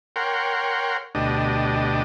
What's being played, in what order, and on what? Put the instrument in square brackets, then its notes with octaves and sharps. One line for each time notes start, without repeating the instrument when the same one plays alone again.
[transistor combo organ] A#4 C#5 F#5 G5 C6
D2 B2 D4 G4 D#5